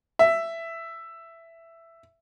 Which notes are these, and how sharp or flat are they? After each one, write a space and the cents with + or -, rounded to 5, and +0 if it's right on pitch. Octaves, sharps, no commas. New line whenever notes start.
E5 +10